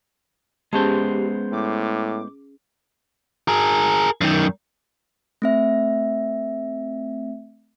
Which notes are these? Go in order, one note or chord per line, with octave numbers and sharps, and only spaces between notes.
G#3 B3 C#4 G4 G#4 C5 A5
A2 D6
G#4 A#4
F#2 D#3
A3 C4 E5